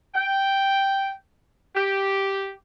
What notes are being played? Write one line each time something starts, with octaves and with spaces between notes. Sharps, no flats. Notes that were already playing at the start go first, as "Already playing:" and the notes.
G5
G4